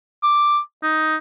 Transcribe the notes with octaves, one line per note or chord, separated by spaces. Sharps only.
D6
D#4